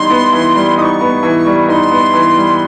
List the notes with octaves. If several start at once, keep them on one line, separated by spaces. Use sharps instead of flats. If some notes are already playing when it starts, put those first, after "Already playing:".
Already playing: E3 G3 B3 D#4 C6
B3
E3
G3
D#4 C#6 D#6
B3
E3
G3
D#4 C6
B3
E3
G3